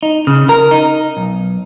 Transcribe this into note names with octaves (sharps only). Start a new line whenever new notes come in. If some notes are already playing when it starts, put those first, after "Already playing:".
D#4
C#3
A#4
D#4
B1